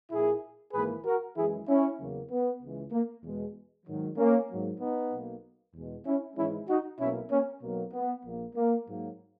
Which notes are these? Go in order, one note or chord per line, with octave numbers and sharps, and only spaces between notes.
A#1 A#2 A#3 E4 G#4
G#1 G#2 E3 A#3 G#4 B4
F#4 A#4
F#2 E3 G#3 E4 G#4
C#4 E4
E2 C#3 F#3 A#3
B3
C#2 C#3 E3 G#3
A#3
E2 B2 G#3
G#2 D#3 F#3
A#3 C#4
G#2 F#3 A#3
B3 D#4
B1 B2 A#3
E2 B2 G#3
C#4 E4
G#2 E3 G#3 C#4 E4
D#4 F#4
B1 B2 A#3 C#4 E4
A#3 C#4
B1 B2 F#3 A#3
B3
A#1 A#2 A#3
A#3
G#2 F#3 A#3